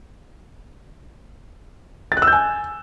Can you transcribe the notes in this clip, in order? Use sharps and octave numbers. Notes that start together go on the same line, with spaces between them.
A6
F#6
E6
G6
G#5